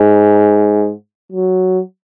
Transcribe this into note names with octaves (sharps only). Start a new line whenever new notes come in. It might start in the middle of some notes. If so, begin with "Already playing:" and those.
Already playing: G#2
F#3